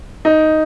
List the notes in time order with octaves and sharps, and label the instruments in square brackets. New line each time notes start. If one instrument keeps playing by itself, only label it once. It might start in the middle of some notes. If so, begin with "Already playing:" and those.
[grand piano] D#4